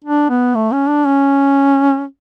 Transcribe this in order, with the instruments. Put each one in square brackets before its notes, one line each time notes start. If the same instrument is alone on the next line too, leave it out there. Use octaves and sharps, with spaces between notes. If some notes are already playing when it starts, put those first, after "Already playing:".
[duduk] D4
B3
A3
C#4
D4
C#4